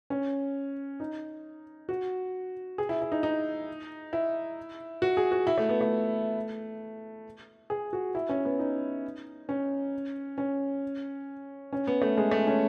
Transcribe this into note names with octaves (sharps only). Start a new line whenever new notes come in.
C#4
D#4
F#4
G#4
E4
E4
D#4
D#4
E4
F#4
G#4
F#4
E4
A3
B3
A3
G#4
F#4
E4
C#4
B3
D#4
C#4
C#4
C#4
B3
A3
G#3
A3
C#4